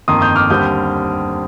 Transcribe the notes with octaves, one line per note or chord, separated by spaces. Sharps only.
G1 F2 D#3 A#3 C6 D#6
D#6 G6
D6 F6
D#2 D3 G3 C4 D#6 G6